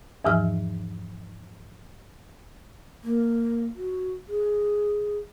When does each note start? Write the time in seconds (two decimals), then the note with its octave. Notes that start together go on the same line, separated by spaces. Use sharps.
0.24 E2 G#2 E3 F3 F6
3.04 A#3
3.76 F#4
4.28 G#4